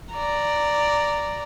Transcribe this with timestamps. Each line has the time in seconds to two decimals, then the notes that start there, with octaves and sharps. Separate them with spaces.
0.13 D5 A#5